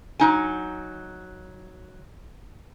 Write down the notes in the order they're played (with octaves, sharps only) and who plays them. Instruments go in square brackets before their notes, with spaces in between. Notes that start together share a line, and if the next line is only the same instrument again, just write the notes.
[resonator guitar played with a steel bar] F#3 D#4 G#5